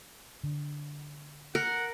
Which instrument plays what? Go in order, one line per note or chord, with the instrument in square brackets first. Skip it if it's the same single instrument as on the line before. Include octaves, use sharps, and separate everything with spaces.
[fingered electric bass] D3
[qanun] A#4 [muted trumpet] F#5